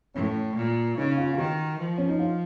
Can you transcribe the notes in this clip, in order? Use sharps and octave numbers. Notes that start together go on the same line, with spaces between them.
A2 C#4
A#2
C#3 D#4
F4
F4
D#3 F#4
F3
C#4
D#4
F4